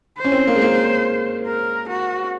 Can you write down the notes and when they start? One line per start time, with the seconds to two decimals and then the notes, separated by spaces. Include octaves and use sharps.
0.18 C5
0.24 C#4
0.32 C4
0.47 A#3
0.56 G#3
0.62 A#3
1.46 A#4
1.89 F#4